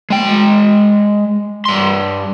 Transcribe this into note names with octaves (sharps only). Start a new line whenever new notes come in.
G#3 G5
G2 C6